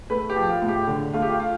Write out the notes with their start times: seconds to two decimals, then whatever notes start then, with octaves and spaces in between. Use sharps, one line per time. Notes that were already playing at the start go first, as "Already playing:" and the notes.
0.10 A3 B4
0.30 G4
0.36 F3
0.49 F4
0.62 A2
0.68 G4
0.87 D3
1.13 A3 F4
1.22 G4
1.29 F4
1.40 F4